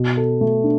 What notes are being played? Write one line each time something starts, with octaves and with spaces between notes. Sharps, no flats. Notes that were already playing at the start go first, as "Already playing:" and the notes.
Already playing: B2
A4
A3
D4